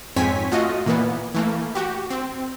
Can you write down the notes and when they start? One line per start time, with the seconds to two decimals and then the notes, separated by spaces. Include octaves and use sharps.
0.16 F2 G#2 C4 C#5 G#5 B6
0.52 A3 F4 F#4 D#5
0.86 A#2 E3 A#3 B3
1.34 E3 A3 A#3
1.75 F#4 G4
2.10 C4